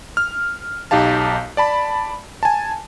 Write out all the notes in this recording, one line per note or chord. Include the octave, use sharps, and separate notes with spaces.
F6
B1 D#4 G4 F5 A5
D5 A5 B5
G#5 A5